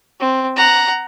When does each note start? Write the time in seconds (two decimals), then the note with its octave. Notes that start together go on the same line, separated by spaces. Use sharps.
0.20 C4
0.56 F#5 A#5